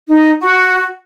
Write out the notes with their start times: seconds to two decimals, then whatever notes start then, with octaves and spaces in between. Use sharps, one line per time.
0.08 D#4
0.40 F#4